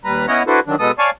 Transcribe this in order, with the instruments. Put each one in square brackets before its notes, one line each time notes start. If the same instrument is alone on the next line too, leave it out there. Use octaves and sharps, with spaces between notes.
[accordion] D#2 G3 B4 A#5
B3 C#4 E4 C#5 D#5 F#5
D4 E4 F#4 A4 B4 C5
D3 D#3 F#3 D4
B2 G#3 B3 A4 D#6
C#5 D5 F5 G#5 A5 C#6